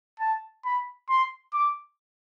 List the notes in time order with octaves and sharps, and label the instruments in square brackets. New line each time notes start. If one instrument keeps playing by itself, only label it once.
[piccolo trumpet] A5
B5
C6
D6